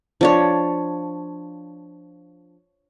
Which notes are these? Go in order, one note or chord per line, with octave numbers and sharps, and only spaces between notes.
F3 D4 C#5